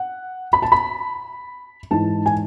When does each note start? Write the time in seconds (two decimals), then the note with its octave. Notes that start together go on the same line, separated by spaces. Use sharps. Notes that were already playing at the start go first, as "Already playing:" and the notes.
Already playing: F#5
0.53 B5
0.62 A5
0.72 B5
1.91 G#2 E3 A5
2.26 G#5